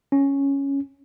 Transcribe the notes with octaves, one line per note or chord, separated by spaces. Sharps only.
C#4